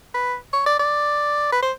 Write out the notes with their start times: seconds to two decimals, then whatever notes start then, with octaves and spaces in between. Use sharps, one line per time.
0.14 B4
0.53 C#5
0.66 D5
0.79 D5
1.52 B4
1.62 C5